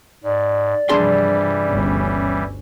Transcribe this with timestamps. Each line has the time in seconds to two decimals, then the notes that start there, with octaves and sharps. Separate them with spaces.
0.24 G#2 D5
0.89 G2 C3 E3 F3 G3 D4 G#4 C6
1.69 G1 D2 C#4